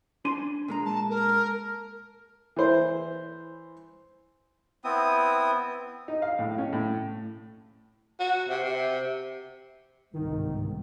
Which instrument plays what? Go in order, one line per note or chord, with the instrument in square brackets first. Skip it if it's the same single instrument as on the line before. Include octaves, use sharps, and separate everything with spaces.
[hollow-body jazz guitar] D4 G#5 C6
A#2 G#3 A#5
[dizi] A5
A#4
[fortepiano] E3 C5
[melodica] B3 C4 E4 D#6
[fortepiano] D#4
F5
A2
C#4
A2
[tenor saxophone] F#4
C3
C3
[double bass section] G1 C2 G#2 [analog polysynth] D#3